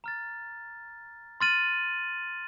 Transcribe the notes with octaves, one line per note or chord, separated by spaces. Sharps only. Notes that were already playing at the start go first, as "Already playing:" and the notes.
A#5 F6 A6
C6 F6 A6 D#7 F#7